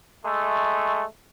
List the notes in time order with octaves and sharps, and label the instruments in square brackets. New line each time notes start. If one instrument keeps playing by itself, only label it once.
[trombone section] G#3 A3